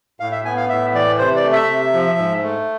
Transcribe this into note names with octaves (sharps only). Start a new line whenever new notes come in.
A2 F5
E5
B3 G#5
F5
A2 E5
E3 D5
C3 C5
D5
A3
E5
C3
F3
G#2
A3